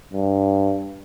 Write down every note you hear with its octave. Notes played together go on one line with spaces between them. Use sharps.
G2